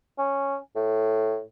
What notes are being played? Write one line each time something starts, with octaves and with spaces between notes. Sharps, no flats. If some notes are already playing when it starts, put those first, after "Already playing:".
C#4
A2